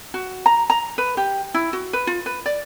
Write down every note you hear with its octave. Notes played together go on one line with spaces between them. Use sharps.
F#4
A#5
A#5
B4
G4
E4
F#4
B4
F4
B4
D5